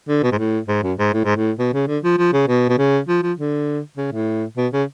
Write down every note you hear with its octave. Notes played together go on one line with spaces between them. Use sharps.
D3
B2
G#2
A2
G#2
F#2
G#2
A2
G#2
A2
B2
C#3
D3
F3
F3
C#3
B2
B2
C#3
F3
F3
D3
C#3
A2
B2
C#3